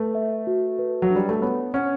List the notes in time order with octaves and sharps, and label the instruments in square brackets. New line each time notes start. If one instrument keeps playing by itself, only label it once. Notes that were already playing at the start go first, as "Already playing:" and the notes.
Already playing: [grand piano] A3 [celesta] B4
[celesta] E5
F#4
B4
[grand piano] F#3
[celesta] D4
[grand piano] G3
A3
[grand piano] B3 [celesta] C#5
[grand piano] C#4 [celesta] F#5